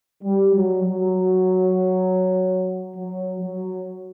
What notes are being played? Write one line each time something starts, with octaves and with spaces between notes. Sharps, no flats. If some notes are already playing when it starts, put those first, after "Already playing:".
G3
F#3
F#3
F#3
F#3